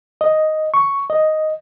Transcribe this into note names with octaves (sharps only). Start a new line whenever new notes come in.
D#5
C#6
D#5